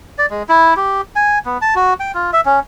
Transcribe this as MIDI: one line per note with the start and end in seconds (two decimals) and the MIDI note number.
0.18 0.26 74
0.30 0.43 56
0.49 0.74 64
0.76 1.01 67
1.16 1.39 80
1.46 1.58 59
1.62 1.74 81
1.76 1.94 66
2.00 2.12 79
2.14 2.31 65
2.33 2.41 76
2.46 2.60 61